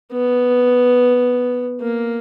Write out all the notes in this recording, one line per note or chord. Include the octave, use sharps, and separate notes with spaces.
B3
A#3